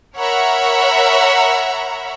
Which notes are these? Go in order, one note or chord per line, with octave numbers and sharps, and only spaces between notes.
A#4 C#5 E5 F#5 A#5 B5